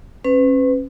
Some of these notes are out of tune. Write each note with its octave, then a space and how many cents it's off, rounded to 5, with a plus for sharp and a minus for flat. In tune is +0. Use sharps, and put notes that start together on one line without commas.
C#4 -35 B4 +30